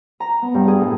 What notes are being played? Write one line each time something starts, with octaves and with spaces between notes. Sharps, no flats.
A#5
B3
G2
G#4
A2